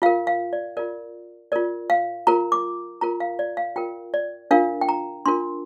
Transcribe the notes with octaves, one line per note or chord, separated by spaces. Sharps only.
F4 A#4 F5
F5
D5
F4 A#4 D5
F4 A#4 D5
F5
F4 A#4 A#5
D6
F4 A#4 A#5
F5
D5
F5
F4 A#4 G5
D5
D4 F4 A#4 F5
G5
A#5
D4 F4 A#4 C6